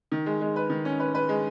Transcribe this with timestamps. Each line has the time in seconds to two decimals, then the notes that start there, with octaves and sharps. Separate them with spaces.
0.12 D#3
0.26 G#3
0.41 G#3
0.56 B4
0.70 D#3
0.85 C#4
1.00 B4
1.15 B4
1.29 G#3